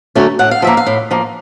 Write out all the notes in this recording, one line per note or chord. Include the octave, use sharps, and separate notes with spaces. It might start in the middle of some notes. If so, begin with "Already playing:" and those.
D3 F#3 A3 C#4
A2 F#5
F5
F3 A#3 E5
F5
A2
F3 A#3